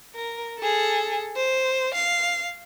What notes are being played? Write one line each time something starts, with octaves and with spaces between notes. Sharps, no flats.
A#4
G#4 A4
C5
F5